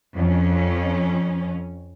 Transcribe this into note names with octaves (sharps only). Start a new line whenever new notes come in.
F2 C#4